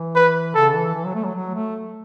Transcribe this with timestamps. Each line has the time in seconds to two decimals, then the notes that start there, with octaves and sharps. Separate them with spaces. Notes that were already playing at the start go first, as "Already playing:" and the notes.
Already playing: E3
0.16 B4
0.54 C#3 A4
0.75 E3
0.95 E3
1.05 F#3
1.15 A3
1.25 F#3
1.36 F#3
1.55 A3